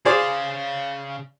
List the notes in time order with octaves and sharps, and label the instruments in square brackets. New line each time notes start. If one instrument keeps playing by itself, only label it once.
[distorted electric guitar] C#3 F5 [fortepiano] G#4 C5 D5